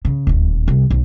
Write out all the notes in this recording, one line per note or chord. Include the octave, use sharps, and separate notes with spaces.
C#3
D#1 D2
C2
B1